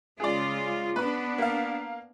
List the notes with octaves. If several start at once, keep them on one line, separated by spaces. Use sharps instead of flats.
C#3 G#3 F4 G#4 D5
B3 D4 B4 B5
A#3 F5